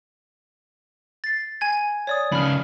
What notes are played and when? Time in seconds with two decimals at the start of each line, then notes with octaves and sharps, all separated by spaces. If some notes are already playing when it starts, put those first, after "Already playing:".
1.24 A6 C7
1.61 G#5 G#6
2.07 C#5 D5 D#6
2.32 C#3 F3 B5 F6